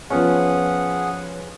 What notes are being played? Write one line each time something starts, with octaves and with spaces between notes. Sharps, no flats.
F3 B3 C#4 G#4 F#5